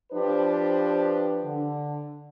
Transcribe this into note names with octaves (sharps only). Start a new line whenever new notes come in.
F3 D4 G4 B4 C5
D3